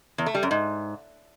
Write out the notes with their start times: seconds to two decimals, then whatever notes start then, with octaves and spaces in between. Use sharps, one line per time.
0.18 E2
0.26 A3
0.35 G3
0.43 F#2
0.51 G#2